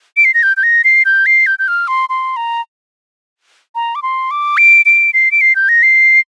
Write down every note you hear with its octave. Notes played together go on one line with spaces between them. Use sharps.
D7
C7
A#6
G6
G6
A#6
C7
G6
C7
G6
G6
F6
C6
C6
A#5
A#5
D6
C6
D6
D7
D7
C7
D7
C7
G6
A#6
C7